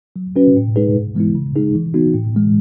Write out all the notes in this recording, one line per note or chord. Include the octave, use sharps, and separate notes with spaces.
F#3
C#4 F#4 B4
A2
G#3 D#4 G#4 B4
G#2
E3 G#3 B3 E4
C#3
G#3 D#4 G#4
E3
B3 D#4 F#4
A2
E3 G#3